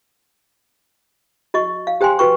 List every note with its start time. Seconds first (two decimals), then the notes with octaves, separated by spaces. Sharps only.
1.54 F#4 D#5 C#6
1.87 F5
2.01 G4 C5 G5 G#5 C6
2.19 F#4 B4 G5 C#6